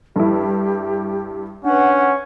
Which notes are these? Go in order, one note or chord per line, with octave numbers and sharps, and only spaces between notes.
G2 E4 G4 A4
C#4 D4 B4 F#5